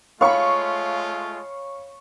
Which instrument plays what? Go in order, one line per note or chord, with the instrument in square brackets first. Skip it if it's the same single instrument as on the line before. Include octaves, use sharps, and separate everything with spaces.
[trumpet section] G#3 A3 F4 [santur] C#5 B5 [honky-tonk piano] F5 C#6